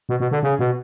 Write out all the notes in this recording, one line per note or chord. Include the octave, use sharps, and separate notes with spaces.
B2
B2
D3
C#3
B2